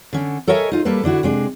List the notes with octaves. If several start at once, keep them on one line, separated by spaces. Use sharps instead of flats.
D3 C#4
A4 A#4 C#5 D#5 E5 G#5
D#4 F4
G3 A#3 A4 B4
D3 D4 E4 F#4
C3 G#3 D4